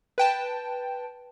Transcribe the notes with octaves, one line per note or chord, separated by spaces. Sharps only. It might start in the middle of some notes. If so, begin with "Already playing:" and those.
B4 G5 A5